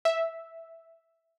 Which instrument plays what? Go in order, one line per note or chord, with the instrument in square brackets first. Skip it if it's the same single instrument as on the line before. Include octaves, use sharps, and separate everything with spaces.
[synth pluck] E5